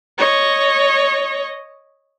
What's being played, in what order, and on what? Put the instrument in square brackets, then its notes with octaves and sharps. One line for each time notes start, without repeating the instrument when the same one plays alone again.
[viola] C#5 D#5